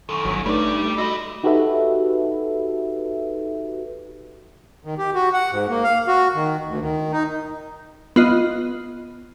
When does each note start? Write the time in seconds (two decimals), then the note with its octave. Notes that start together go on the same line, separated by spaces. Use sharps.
0.09 F#2 D#3 A4 C6 C#6
0.25 G1 F#3
0.46 G2 G3 A3 D#4 D5
0.98 F#4 A4 D#5 B5
1.44 D#4 F#4 G4 A4 B4 E5
4.85 D#3
4.98 G4
5.14 F#4
5.33 F#5
5.51 G#2
5.69 A#3
5.84 F5
6.08 F#4
6.34 D#3
6.67 D2
6.81 D#3
7.12 D#4
8.16 B3 F4 D#5